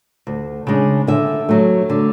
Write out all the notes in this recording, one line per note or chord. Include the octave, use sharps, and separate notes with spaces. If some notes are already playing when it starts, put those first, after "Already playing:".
D2
C#3 G#3 D4
D3 E5
F#3 A3
D3